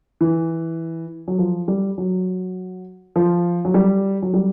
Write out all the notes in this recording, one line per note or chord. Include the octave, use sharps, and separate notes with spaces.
E3
F#3
F3
G3
F#3
F3
F#3
G3
F#3
G3